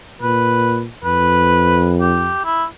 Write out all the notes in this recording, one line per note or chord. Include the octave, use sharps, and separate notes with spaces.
A#2 B4
F2 B4
G4
E4